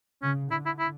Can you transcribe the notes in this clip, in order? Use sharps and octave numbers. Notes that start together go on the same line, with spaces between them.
C#3 C#4
D3 E4
E4
E4